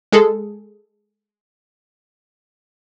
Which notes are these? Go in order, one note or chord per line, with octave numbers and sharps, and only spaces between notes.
G#3 G#4 A4